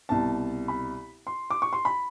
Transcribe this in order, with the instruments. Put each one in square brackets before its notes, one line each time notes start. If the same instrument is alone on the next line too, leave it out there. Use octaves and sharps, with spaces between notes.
[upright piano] C2 B2 A5
B5
C6
D6
C#6
C6
B5